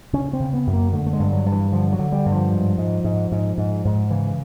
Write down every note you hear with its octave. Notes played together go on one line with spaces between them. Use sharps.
C#3 C#4
C4
C#3
B3
F#2
A#3
D3 A3
A3
G#3
G2
F#3
G2
E3
D3 F3
F#3
D3
G3
G2
F3
G#2
G#2
G#2
G#2
G#2
G#2
C#3 E3